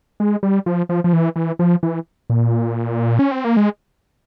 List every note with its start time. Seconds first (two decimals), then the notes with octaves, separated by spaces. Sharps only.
0.20 G#3
0.43 G3
0.66 F3
0.89 F3
1.04 F3
1.13 E3
1.36 E3
1.59 F3
1.83 E3
2.30 A#2
3.19 C#4
3.31 C4
3.44 A#3
3.57 G#3